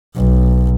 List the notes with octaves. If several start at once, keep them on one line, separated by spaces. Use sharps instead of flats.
B1